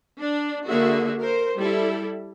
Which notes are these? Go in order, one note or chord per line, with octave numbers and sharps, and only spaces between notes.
D4
D3 A#3 F#4 G#4 E5
A#4 C5
G3 E4 A4